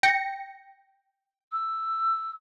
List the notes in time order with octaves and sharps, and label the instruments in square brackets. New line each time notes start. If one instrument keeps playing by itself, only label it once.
[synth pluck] G5 A#6 C#7
[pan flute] E6